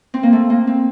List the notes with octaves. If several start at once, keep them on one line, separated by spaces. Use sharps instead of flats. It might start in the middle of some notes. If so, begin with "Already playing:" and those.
C4
A#3
A3
A#3
C4